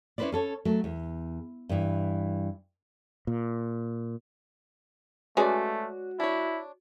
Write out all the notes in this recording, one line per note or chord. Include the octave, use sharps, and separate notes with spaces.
C#4 E4 G#4 B4 C5 D5
C#4 A4 C#5
F#3 A3
E2
G2 E3
A#2
G#3 A3 C#4 F#4 G#4 B4 D5
D4 E4 C#5